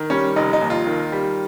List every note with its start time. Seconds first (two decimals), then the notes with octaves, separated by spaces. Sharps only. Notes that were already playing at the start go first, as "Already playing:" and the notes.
Already playing: D#3
0.10 G3 C#4
0.36 F1 D#4
0.53 D#4
0.61 D#2
0.70 F4
0.87 D#3
1.12 G3